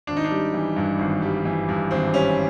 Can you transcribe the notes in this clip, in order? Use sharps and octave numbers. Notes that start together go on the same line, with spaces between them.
G#1 D4
D#4
D4
G3
E3
G2
G#1
G3
E3
G2
G#1 C4
G3 C#4